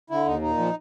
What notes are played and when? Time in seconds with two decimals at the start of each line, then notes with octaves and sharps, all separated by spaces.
0.10 D3 E4
0.26 D#2 D#4
0.42 A#2 D#4
0.58 F3